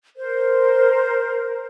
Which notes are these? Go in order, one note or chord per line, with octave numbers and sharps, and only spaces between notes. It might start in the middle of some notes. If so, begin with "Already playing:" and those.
A#4 C5